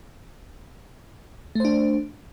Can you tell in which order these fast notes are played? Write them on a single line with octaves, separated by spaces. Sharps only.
A3 C5 D4